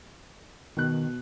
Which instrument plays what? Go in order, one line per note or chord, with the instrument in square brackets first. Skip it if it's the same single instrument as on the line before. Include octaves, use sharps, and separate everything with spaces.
[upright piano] B2 F#6 [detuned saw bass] D#3